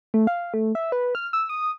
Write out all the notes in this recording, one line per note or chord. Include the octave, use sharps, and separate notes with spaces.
A3
F5
A3
E5
B4
F6
E6
D#6